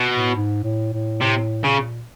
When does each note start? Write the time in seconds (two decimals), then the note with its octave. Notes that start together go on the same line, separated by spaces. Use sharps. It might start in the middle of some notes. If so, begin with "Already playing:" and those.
Already playing: B2
0.14 A2
0.36 G#2
0.64 A2
0.93 A2
1.21 A2 C3
1.64 A#2 C#3